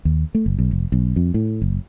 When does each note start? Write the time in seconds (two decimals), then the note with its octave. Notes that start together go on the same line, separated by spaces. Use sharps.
0.05 D#2
0.35 A3
0.46 F#1
0.58 B1
0.71 F1
0.92 B1
1.16 F2
1.34 A2
1.62 F#1